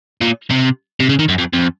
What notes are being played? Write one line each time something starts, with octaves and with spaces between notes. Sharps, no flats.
A#2
C3
C3
C#3
D#3
F#2
F2
F2